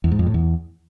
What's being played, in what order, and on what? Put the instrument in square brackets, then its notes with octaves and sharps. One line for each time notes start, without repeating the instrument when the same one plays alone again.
[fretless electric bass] E2
G#2
F2
A2
E2